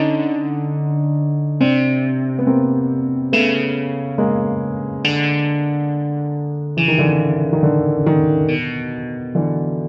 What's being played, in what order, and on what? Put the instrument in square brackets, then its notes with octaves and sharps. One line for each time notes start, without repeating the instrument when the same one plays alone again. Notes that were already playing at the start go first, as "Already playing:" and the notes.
Already playing: [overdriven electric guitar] D3 [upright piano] C#4 D#4
[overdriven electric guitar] C3 [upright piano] C4 D4
[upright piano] B3
A#3 C4
[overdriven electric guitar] C#3 [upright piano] A3 B3
[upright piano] G#3 A#3
[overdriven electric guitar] D3
[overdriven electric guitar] C#3 [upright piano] E3
[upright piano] D#3
D3 E3
D#3
D3
D#3
[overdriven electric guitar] B2
[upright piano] D3 E3